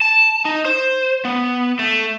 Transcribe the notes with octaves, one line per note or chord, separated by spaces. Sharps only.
A5
D#4
C5
B3
A3